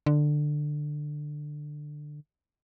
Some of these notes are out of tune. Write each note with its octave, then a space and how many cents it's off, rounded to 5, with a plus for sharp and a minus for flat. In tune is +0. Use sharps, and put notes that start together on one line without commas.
D3 +15